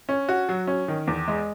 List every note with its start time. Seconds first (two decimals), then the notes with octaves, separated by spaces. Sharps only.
0.09 C#4
0.29 F#4
0.49 F#3
0.67 C#4
0.88 D#3
1.07 E2
1.28 G#3